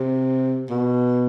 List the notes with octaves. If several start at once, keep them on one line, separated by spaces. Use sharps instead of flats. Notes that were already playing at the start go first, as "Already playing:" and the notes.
Already playing: C3
B2